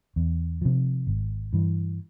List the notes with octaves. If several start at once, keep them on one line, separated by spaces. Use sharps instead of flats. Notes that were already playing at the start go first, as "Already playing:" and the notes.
E2
C3 F3
G#1
G2 E3